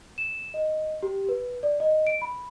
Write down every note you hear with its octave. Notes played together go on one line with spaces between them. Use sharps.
E7
D#5
G4
B4
D5
D#5
D7
B5